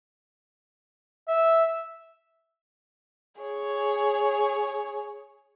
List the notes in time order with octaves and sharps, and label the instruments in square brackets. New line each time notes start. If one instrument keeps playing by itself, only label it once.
[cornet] E5
[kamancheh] G#4 C#5